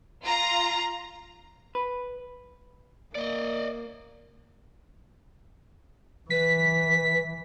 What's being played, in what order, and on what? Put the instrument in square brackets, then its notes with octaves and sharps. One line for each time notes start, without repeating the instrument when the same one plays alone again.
[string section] F4 A#5
[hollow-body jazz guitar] B4
[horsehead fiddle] A#3 [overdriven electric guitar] D5 D#5
[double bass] E3 [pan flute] B4 [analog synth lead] B6